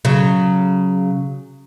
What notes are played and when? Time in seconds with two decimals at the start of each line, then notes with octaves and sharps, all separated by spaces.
0.05 C#3 F#3